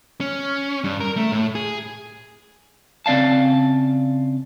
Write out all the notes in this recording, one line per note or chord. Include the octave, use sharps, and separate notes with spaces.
C#4
G2
A#4
A3
A2
G#4
C#3 C4 D5 F5 A5